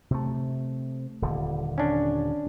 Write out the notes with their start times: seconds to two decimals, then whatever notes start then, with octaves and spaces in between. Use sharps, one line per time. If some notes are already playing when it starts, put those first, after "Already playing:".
0.11 C3 A3
1.22 D#1 D3
1.78 C#4 D4